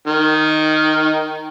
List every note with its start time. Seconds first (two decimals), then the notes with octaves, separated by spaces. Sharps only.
0.08 D#3